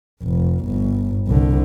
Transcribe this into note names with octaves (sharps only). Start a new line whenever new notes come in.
F1
G1 G2
C2 D3